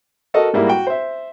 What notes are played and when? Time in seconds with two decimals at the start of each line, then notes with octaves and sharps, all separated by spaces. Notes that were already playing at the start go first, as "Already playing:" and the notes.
0.34 F#4 A4 A#4 D#5
0.54 G#2 G3 A#3 E4
0.67 F#4 G5
0.87 C5 E5